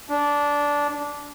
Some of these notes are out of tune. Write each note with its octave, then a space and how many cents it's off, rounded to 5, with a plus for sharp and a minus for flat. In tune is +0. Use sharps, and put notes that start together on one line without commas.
D4 -15